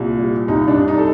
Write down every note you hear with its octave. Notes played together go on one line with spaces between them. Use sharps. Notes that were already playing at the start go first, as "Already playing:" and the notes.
Already playing: C2 A#2
G3
C2 D#4
D4
C2
D#4
A4